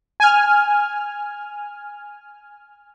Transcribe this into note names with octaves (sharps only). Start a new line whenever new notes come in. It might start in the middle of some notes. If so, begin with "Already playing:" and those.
G#5 F6